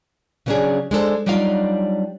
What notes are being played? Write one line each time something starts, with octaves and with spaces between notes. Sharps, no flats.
C#3 F#3 B3 C#4 D4 G#4
G#3 D4 A4 C5
F#3 G3 D4 D#4 F4 F5